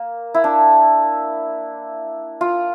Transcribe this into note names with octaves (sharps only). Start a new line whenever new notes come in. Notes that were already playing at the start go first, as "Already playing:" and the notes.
Already playing: A#3
E4
D4
F4